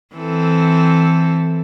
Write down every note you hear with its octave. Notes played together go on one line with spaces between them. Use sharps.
E3 C4 A4